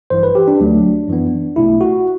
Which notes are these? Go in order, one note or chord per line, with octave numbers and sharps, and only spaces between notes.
A1 G2 E3 C5
B4
G4
D4
D2 D3 F#3 A3 D4
F#2 E3 B3
B1 B2 A3 E4
F#4